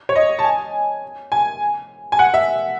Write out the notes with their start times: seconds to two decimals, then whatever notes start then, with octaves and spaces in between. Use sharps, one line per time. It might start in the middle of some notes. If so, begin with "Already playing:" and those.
0.09 C#5
0.16 D#5
0.39 A5
0.44 G#5
1.32 G#5
2.12 G#5
2.19 F#5
2.34 E5